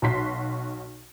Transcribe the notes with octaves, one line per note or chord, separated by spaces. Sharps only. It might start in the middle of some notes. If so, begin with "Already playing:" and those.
B1 F#4 C6 B6